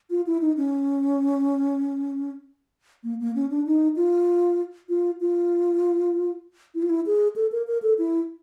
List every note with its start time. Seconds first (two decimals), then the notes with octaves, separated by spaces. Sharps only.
0.10 F4
0.27 E4
0.41 D#4
0.57 C#4
3.04 A#3
3.20 A#3
3.35 C#4
3.50 D4
3.66 D#4
3.96 F4
4.89 F4
5.21 F4
6.75 E4
6.82 F4
6.90 E4
7.06 G#4
7.36 A4
7.52 A#4
7.67 A#4
7.82 A4
7.98 E4